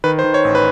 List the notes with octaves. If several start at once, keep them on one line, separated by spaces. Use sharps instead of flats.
D#3 B4
C5
D#3
C#5
A1
B4